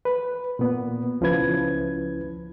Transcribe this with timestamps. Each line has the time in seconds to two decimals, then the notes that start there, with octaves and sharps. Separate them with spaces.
0.05 B4
0.59 A#2 B3
1.21 C#2 F3 C#4 E4 B4 G#6